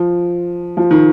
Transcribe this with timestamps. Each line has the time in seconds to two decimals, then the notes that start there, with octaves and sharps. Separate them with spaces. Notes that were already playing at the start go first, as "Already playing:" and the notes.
Already playing: F3
0.77 F3
0.91 D#3